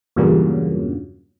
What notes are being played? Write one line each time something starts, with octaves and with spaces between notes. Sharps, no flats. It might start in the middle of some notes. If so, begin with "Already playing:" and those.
E2 G2 A#2 C#3 F#3